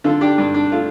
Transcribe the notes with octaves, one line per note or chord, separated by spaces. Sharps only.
D3 F4 A4
D4 G4
G2 D4
D4
A3 F4